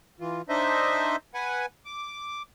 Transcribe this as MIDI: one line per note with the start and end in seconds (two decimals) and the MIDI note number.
0.20 0.42 52
0.20 0.42 65
0.49 1.16 62
0.49 1.16 63
0.49 1.16 72
0.49 1.16 75
0.49 1.16 76
1.34 1.66 71
1.34 1.66 78
1.34 1.66 80
1.85 2.42 86